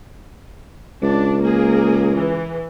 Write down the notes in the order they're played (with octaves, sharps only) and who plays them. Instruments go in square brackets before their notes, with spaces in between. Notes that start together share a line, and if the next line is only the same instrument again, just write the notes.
[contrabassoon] C#2 [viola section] D4
[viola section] A#3 G#4 A#4
E3